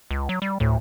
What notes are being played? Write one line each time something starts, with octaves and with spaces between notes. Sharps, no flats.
C#2
F#3
G3
D2 A2